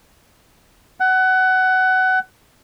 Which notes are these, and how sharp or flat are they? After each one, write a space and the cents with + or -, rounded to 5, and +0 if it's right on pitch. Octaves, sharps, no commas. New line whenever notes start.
F#5 +20